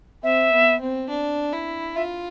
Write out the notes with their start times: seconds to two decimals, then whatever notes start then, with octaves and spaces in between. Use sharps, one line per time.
0.23 C4 E5
0.52 B3
0.80 C4
1.09 D4
1.53 E4
1.96 F4 E5